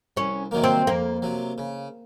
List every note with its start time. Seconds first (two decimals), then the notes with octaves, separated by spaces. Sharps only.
0.17 C2 C#4
0.51 C3 D#3 F#3 A#3
0.64 C4
0.87 F2 A#3
1.22 C3 F#3
1.58 C#3